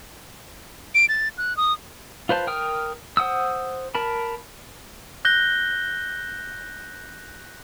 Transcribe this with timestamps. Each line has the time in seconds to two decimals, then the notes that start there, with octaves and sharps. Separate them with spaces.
0.95 D7
1.09 A6
1.38 F#6
1.57 D#6
2.29 F4 B4 C5 A5
2.47 A#4 G5 D#6 F6
3.17 C5 F#5 D#6 E6
3.95 A#4 A5 B5
5.25 F#6 G6 A#6 G7